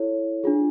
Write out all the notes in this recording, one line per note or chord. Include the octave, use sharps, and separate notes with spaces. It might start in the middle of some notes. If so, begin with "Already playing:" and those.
Already playing: E4 A4 C#5
D4 F4 G#4